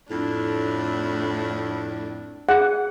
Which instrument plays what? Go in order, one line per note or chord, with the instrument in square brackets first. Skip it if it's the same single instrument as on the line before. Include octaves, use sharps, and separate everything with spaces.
[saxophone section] F2 A2 [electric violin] D4
[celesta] G#4 [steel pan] F#5